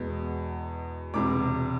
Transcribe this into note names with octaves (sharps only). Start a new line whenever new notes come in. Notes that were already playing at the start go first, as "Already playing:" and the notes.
Already playing: E2 B2 G#3 B3
E1 E2 C3 D6